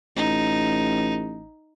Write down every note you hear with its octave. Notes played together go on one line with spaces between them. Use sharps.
A1 D#4